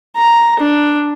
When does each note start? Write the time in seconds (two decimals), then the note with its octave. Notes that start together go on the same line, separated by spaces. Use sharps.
0.17 A#5
0.60 D4